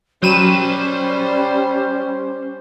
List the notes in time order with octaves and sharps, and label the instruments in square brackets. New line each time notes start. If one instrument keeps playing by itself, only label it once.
[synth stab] F#3 D#7 E7 [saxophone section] G3 [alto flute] C#4 [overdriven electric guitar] C5 B5